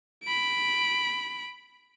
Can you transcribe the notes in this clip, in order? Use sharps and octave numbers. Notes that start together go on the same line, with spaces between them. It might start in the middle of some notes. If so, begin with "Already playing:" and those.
B5 D7